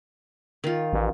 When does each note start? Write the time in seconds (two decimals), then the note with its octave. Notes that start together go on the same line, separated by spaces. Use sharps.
0.64 D#3 F4
0.93 A1